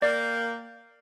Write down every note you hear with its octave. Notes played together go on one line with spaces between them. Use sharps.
A#3 D5 G5